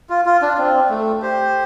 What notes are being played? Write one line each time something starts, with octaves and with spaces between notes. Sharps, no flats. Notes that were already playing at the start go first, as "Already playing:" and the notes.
F4
F4
D4
C4
A3
G4 C5